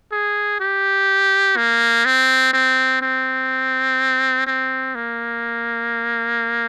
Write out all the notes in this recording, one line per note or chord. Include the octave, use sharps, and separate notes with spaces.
G#4
G4
A#3
C4
C4
C4
C4
A#3